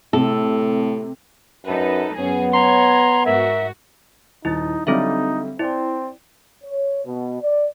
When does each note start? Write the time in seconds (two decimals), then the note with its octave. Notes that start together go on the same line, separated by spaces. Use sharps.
0.13 A2 C3 A4
1.65 F#2 D#4 A4 B4
2.17 F#2 B3 C#4 G#4
2.54 C#5 A#5 C6 G#6
3.26 G#2 F#4 A#4 E5
4.45 D#1 D#4 E4 A6
4.87 D3 F#3 G3 C4 D#4 A4 E5
5.59 C4 E4 D5 G5
6.64 C#5
7.05 B2
7.41 D5